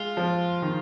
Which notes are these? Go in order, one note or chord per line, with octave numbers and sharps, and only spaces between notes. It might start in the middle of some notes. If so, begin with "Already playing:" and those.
Already playing: G#3 F4
F3
D#3